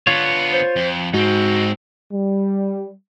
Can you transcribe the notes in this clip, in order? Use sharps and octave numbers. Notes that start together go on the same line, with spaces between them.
D3 B3 F4 C#5
C5
F2
G#2 C4 D#4 F#4
G3